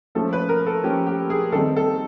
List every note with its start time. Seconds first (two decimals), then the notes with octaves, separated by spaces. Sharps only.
0.15 F3 A3 C#4 A4
0.33 B4
0.49 A#4
0.67 A4
0.83 F3 A3 C#4 G4
1.07 G4
1.30 G#4
1.52 D#3 G3 C4 D#4 A4
1.76 A4